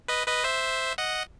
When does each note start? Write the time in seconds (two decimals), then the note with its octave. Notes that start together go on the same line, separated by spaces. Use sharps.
0.08 B4 D#5
0.27 B4 D#5
0.44 C5 E5
0.98 D#5 F#5